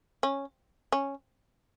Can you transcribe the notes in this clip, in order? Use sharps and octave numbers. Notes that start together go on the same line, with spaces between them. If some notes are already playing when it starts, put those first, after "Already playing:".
C#4
C#4